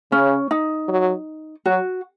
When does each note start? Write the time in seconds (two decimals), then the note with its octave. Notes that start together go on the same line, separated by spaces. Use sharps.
0.12 C#3 C#4
0.51 D#4
0.88 F#3
1.66 F#3 F#4